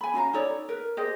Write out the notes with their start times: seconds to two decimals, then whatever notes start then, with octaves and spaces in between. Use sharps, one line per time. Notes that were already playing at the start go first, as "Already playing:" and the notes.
0.01 G#5 B5
0.13 C#4 F#4 F5 A#5
0.33 D#4 A4 C#5 D5
0.69 A#4 B4
0.97 G4 G#4 C5 D#5